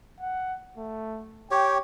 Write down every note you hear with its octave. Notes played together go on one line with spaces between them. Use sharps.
F#5
A3
G4 C#5 G5